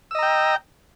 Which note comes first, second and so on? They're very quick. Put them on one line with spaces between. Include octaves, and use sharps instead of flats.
E6 D#5 A#5 G5